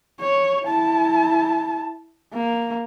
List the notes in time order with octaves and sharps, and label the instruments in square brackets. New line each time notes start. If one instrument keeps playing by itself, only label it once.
[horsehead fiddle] C#5
E4 A5
A#3